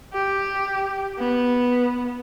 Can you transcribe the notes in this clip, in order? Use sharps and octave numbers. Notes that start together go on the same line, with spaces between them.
G4
B3